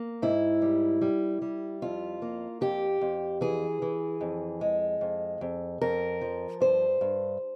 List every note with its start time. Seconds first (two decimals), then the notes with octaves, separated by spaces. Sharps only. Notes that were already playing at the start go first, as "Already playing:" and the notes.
Already playing: A#3
0.22 G#2 E4
0.62 G3
1.01 G3
1.42 G3
1.82 F2 F4
2.22 A#3
2.61 F2 G4
3.01 F2
3.41 E3 G#4
3.82 E3
4.21 F2
4.61 G#3
5.01 F2
5.41 F2
5.81 F2 A#4
6.21 F3
6.60 G2 C5
7.01 G2